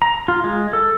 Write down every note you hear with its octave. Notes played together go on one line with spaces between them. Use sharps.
A#5
F4
G#3
A4